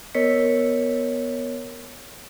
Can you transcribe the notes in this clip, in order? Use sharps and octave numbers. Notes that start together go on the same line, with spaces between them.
B3 A#4 C#5 D#5 B6 C#7